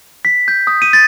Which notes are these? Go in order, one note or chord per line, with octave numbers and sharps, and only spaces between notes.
B6
G6
D#6
D#7
A6